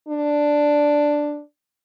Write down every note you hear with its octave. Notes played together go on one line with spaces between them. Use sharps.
D4